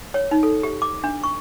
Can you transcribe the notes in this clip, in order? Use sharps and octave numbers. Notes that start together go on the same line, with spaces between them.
C#5
D#4
A4
G4
D6
D4
C#6